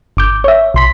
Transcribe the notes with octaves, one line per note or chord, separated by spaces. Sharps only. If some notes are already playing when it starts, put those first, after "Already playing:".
G1 D6 G6
C#5 E5
B1 C6 B6